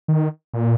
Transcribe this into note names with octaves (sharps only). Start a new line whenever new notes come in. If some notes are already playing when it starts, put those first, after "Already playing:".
D#3
A#2